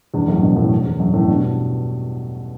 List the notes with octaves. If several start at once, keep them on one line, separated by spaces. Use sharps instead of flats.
E2 G2
G2
F#2 A2
G2 B2
F#2 A2
E2
F#2
F#2 A2
G2 B2